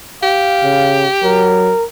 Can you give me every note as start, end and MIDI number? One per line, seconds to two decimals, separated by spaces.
0.23 1.72 67
0.23 1.11 77
0.64 1.06 49
1.23 1.72 54
1.23 1.84 70